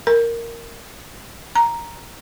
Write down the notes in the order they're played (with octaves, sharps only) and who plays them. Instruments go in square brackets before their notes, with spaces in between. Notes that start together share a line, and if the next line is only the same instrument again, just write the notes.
[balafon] A#4
A#5